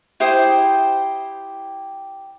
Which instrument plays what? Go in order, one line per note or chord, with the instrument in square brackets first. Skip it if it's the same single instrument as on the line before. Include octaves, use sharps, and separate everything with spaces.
[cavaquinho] E4 G4 C5 D#6